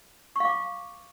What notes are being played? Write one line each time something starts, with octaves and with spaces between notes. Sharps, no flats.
F5 C#6 D6